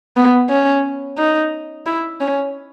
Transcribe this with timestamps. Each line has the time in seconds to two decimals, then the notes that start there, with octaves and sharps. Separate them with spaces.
0.17 B3
0.50 C#4
1.18 D#4
1.86 E4
2.21 C#4